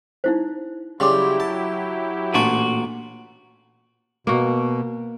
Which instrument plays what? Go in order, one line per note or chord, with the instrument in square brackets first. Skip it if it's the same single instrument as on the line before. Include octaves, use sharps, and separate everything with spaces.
[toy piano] D#4 E4 C5
[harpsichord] C#3 G3 [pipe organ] F#3 E4 G4 [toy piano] C6 D6
[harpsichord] A5
[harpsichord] A1 A5 B5 [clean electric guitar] A#2 F#4 [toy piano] D4
[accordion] B2 [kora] A#3 F#4